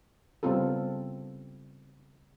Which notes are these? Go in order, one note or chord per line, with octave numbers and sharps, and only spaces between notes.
C#3 G3 B3 C4 F4 A4